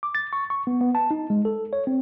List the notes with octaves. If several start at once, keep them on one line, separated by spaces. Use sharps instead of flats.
D6
A6
C#6
C#6
B3
B3
A5
D#4
G#3
A4
C#5
C4